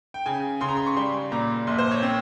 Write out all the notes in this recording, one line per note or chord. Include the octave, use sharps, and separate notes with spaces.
G5
C#3 G#5
C#3 C6
A#5
C6
C#6
G3 C6
A#2 A#5
A#1 C6
C5
C#5
C4